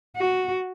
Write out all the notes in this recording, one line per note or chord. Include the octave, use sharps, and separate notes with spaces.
F#4